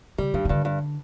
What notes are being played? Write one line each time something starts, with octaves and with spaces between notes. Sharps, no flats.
C#3 G3
G2 D#3
D#3
G2 D3
G2